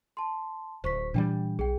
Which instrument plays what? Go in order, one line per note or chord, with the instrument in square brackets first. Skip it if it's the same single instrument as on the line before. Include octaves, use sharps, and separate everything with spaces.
[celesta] A5 C6
[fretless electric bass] D1 [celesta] C5 C#6 B6
[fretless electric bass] A#2 E3 G3 [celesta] D4 G5
[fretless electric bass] B1 [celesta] G#4 G5